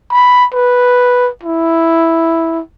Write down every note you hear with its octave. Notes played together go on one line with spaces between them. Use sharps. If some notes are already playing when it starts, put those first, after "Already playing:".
B5
B4
E4